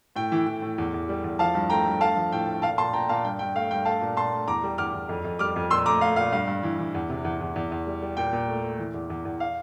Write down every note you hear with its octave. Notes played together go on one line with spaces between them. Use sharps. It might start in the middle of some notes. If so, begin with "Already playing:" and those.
A2 G5
E3
E3
A2
E2
E2
G3
E2
F3 F5 A5
G2
A3 G5 A#5
G2
A3 F5 A5
F3
A2 G5
A3
A#2 F5 A5
A#2 A5 C6
A#2 G5 A#5
A#2 F5 A5
G2 G5
G2 G5
A3 F5
G2 G5
A3 F5 A5
A#2
A#2 A5 C6
A3
E2 A#5 D6
G3
E2 D6 F6
E2
F2
F2
G3 D6 F6
F2
A#2 C6 E6
A3 A#5 D6
A3 F5
A#2 F5
G2 F5
G2
E3
E3
E2
C3
E2
E2
E2
E2
G3
G3
A#2 G5
A#2
A3
A3
E3
E2
E2
E2
F5